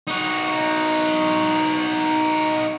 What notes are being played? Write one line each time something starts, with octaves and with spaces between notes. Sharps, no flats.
D#4 F#4